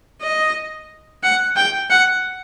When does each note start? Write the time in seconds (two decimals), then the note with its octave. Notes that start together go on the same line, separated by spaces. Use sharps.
0.22 D#5
1.23 F#5
1.56 G5
1.90 F#5